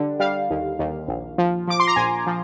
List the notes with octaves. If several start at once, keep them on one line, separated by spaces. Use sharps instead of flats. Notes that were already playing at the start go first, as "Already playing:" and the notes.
Already playing: D3 G3
G3 F5
D#2
D#2
A#1
F3
F3 D6
C6
A#5
A#1 G#5
F3